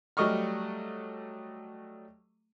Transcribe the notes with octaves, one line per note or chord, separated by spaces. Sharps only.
F#3 G3 A3 D#5 C#6 F6